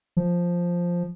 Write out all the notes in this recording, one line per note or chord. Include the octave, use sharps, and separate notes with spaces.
F3